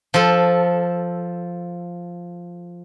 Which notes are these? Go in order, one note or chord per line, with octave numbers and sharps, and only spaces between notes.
F3 A4